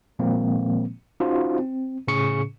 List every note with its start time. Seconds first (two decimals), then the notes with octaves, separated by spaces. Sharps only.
0.19 A#2 D#3 F3 G#3 A#3 C4
1.20 C#4 D#4 F4 F#4 C5
1.59 C4
2.07 A2 C#3 C#4 G#4 C#6 C#7